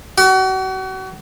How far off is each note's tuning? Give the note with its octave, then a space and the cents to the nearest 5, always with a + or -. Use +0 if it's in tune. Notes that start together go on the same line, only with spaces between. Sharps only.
F#4 +35